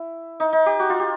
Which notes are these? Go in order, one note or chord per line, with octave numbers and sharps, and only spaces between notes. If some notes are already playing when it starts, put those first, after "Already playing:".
Already playing: E4
D#4
D#4
G4
F#4
F4
G4